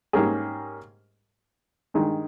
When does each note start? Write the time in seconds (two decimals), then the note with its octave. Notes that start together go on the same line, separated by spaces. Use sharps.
0.13 G#2 G3 A#3 C#4 G#4
1.94 G2 D#3 G#3 D#4